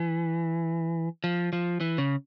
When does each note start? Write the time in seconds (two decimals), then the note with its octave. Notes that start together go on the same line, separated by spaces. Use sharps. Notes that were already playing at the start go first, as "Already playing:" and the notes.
Already playing: E3
1.24 F3
1.53 F3
1.81 E3
1.98 C#3